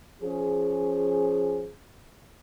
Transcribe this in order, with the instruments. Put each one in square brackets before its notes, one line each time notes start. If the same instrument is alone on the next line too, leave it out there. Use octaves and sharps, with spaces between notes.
[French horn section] F3 C#4 G#4